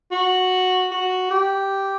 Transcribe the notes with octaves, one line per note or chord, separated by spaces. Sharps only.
F#4
F#4
G4